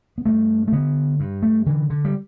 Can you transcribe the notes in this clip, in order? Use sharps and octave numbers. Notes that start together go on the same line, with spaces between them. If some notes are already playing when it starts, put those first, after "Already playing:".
B3
G2 A3
A3
D3 B3
G2
A3
D3 E3
D3
G3